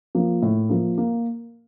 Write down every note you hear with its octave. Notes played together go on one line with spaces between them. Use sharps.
F3 A#3
A2
F3 A#3
A#3